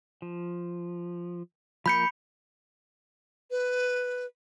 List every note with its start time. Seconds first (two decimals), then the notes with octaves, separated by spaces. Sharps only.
0.22 F3
1.86 F3 A#3 A#4 B5 G6 C#7
3.51 B4